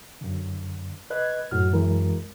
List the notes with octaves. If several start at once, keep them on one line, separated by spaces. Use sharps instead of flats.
F#2 D3
B4 D#5 F#6 G#6
F#2 A2 F#4 F6
E3 G#3 A#4